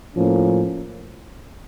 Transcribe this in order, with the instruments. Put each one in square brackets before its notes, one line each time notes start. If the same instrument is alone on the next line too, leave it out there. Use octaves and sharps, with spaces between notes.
[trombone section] A2 F3 A#3 C#4